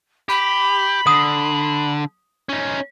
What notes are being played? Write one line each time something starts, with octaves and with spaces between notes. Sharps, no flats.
G4 B5
D3 D#6
C#4 D#4